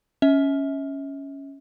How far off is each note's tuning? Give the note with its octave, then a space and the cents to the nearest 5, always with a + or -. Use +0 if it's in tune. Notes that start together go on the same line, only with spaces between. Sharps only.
C#4 +0 E5 -35